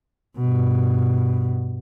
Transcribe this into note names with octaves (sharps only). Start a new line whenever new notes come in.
G2 B2